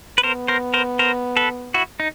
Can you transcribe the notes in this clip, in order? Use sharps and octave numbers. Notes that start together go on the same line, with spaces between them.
B4
B3 A#4 C5
A#4 C5
A#4 C5
A#4 C5
A4 B4
E4 F#4
D#4